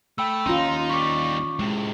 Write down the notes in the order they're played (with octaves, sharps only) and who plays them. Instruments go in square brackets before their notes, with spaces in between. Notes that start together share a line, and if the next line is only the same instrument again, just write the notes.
[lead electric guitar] A3 [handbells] G5 B5 E6
[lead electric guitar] D#2 [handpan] C#4 F4 [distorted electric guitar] D#4 [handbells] A#5 C6
[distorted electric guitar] G3 D#4 [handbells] C#6 D6
[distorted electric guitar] A2 C3 [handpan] G#3